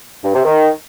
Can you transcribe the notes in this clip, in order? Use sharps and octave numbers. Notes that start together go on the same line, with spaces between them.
G2
C3
D#3